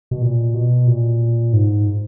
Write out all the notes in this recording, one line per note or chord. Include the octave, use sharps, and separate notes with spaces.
B2
A#2
B2
A#2
G#2